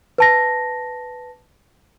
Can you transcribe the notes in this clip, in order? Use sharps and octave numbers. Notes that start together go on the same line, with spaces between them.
B4 A5 A#6